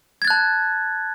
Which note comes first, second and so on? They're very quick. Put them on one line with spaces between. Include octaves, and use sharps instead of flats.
G#6 A6 F#6 A5